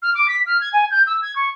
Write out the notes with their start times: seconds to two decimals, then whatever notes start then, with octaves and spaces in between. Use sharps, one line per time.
0.02 F6
0.15 D6
0.28 B6
0.46 F6
0.61 G#6
0.73 G#5
0.91 G6
1.07 E6
1.22 G#6
1.36 C#6